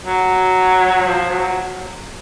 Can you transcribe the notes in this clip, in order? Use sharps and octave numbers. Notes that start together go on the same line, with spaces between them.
F#3
F3
F#3